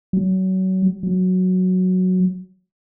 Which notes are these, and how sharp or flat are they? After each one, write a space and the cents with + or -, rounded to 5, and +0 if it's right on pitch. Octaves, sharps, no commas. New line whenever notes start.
F#3 +25
F#3 -5